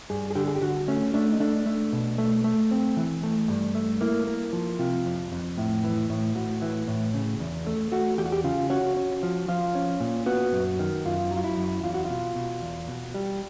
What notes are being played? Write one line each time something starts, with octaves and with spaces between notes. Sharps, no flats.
G2 G#4
G#4
D3 G4
G#4
G4
D3 F#4
A3 C#4
A3 D4
D#4
A3 D4
A3
B2
A3
A3
C4
E3
A3
G2
A3
A#3 E4
A#3
F3
C3 F4
F2
F2
A2
E3
A2
A2 F#4
E3
A2
C#3
E2
A3
A3 F#4
E2 G4
F#4
G4
C#3 F4
C#4 F#4
C#4
F3
F3 F4
C#4
A#2
B3 F#4
F#2
D#3
F#2 F4
F#3
F4
E4
F#2
E2 F4
F#4
B2 F4
B2
E2
B2
G3